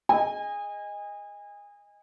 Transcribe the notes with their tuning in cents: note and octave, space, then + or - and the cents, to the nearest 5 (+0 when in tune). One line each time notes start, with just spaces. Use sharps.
G#4 +0 D#5 +0 G#5 -30